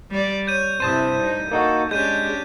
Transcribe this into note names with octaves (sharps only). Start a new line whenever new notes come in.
G3 D5
C#5 G6 D#7
G2 C3 E4 C5 A5 D#6 D#7
G3 D#4
A#3 D#4 F#4 A4
G#3 C#4 D4 G4 G6 D#7